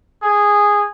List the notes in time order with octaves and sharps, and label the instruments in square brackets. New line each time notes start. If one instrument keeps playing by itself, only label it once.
[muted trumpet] G#4